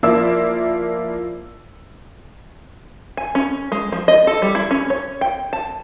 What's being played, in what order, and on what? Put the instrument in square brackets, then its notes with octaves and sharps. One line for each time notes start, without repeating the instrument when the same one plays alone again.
[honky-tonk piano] F3 A#3 E4 D5 E6
[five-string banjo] G#5
C#4
G#3
F3
D#5
A4
G3
E4
C#4
C#5
G5
A5